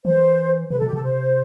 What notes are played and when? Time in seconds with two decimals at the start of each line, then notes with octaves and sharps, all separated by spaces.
0.04 E3 C5
0.70 C3 B4
0.79 A4
0.82 B2
0.87 G4
0.93 C3 A4
1.03 C5